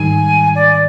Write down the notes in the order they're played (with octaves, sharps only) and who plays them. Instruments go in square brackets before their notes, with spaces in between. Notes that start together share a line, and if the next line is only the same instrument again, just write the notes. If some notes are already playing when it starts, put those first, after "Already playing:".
Already playing: [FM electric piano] G#2 D#3 G3 [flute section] G#5
[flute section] D5